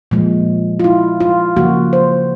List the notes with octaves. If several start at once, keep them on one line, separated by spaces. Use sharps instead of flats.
A#2 F3 G#3
F4
E4
F4
C#3 F3 A#3 F#4
C5